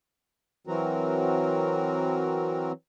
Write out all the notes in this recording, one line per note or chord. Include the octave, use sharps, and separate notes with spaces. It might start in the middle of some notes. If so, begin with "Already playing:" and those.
E3 F#3 C4 F#4 A#4